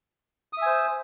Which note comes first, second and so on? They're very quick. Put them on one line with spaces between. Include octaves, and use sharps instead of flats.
D#6 E5 G#5 C5